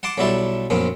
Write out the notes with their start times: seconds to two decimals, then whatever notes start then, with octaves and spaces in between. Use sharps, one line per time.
0.03 F#5 A5 C6 D6
0.18 B1 F#3 G3 E4 G4 A5
0.70 A#1 F#2 B3 C4